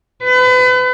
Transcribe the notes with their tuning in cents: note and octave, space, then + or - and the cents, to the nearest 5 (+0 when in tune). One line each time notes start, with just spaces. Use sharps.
B4 +35